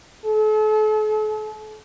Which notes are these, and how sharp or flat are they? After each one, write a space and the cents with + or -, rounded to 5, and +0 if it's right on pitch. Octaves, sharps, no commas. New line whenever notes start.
A4 -40